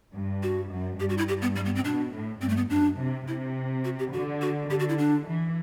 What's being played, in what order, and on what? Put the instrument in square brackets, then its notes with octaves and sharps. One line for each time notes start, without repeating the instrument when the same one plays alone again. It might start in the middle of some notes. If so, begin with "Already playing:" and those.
[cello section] G2
[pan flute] F#4
[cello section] F#2
[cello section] G2 [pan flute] G4
[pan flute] F#4
E4
G4
B3
G3
B3
C4
[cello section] B2 [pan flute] D4
[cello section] A2
[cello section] G2 [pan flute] C4
[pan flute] A3
B3
[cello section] F#2 [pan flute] D4
[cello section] C3
[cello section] C3 [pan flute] E4
[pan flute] F#4
G4
[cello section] D3 [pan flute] F#4
[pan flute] F#4
[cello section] D3 [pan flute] G4
[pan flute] F#4
E4
D4
[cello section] E3